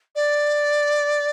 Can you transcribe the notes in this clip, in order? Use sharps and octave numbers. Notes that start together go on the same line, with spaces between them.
D5